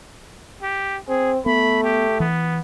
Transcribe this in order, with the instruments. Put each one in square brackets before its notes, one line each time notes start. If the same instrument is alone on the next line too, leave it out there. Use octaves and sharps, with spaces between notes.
[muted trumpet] G4
[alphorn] C4 [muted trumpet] G#4
[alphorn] A3 [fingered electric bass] B3 [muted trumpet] B5
[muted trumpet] G4
[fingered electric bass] E3 [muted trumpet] B3